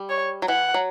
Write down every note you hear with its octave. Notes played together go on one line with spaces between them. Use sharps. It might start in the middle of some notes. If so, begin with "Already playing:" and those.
Already playing: G3
C#5
F#3
E3 F#5
F#3